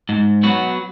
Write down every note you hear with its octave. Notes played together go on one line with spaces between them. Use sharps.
G#2
F#3 B3 F#4